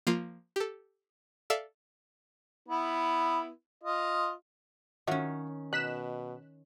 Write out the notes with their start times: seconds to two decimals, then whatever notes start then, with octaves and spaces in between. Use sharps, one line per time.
0.07 F3 A#3 F4 F5
0.56 G4 A4
1.50 A4 D5 E5 F5
2.69 B3 E4
3.84 F4 D#5
5.07 D#3 F#3 C#4 F4 E5
5.73 B2 D#4 F#6 B6 E7